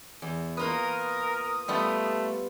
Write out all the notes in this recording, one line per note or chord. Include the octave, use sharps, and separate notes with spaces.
E2
A#3 F4 A#4 B4 D#6
G3 A3 B3 F4